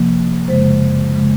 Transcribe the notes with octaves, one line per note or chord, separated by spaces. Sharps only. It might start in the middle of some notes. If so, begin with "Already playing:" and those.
Already playing: C3 F3 A#3
F#2 C#3 G#3 C5
C#3 G#3